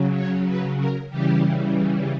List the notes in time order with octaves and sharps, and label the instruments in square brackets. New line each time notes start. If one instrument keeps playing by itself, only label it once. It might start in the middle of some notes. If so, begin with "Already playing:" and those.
Already playing: [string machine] C#3 F#3
C#5
B4
A#4
C#3 E3 G3 G4